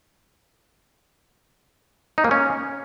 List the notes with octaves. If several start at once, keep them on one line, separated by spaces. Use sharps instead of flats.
D#4
A#3
C#4